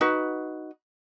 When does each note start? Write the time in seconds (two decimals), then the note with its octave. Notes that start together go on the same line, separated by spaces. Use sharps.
0.01 D#4 F#4 B4